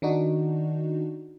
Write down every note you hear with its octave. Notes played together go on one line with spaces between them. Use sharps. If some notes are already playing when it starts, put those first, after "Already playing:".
D#3 D4 D#4 F#4